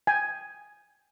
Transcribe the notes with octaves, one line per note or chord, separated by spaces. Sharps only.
G5 G#5